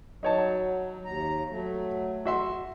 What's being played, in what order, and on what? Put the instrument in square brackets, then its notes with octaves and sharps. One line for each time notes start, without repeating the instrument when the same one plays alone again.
[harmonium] F#3 [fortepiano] D#4 C#5 A5
[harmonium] D#2 A#5
F#3 A3
[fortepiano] F#4 E5 C6